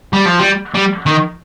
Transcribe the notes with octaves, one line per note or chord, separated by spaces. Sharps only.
G3
F3
G3
G3
D#3